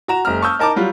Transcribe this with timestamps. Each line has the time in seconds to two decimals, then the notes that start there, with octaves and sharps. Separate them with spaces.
0.08 F#4 A#5 E7
0.25 F#1 G#3 A#5 F6
0.42 A5 C#6 D#6 E6 G6
0.59 D#4 A#4 A5 A#5 D6
0.76 F#3 G3 F4